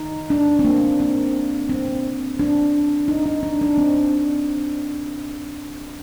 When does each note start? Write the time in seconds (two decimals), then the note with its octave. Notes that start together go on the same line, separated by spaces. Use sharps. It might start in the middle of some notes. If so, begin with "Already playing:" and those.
Already playing: D#4
0.30 D4
0.59 C4
0.65 A#3
1.00 C4
1.69 C4
2.39 D4
3.08 D#4
3.26 D#4
3.43 D4
3.61 D4
3.78 C4